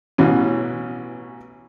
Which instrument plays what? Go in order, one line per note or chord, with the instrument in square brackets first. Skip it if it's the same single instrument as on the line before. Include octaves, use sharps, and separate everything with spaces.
[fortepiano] A1 B2 E3 C#4